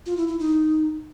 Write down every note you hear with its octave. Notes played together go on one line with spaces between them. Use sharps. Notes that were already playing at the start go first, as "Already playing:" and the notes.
F4
E4
E4
D#4